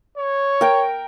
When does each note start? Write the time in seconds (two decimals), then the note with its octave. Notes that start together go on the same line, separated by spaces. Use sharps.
0.18 C#5
0.61 A#4 G5